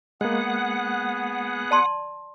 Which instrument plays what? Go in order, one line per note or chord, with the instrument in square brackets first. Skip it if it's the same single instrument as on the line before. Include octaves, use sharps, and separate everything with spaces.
[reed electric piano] G#3 A#3 [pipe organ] B3 G#4 [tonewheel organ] F#5
[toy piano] D5 A5 C6